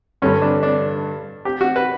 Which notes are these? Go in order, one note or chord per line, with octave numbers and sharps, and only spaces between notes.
G2 D3 G3 C#4
D4
D4
G4
F#4
B4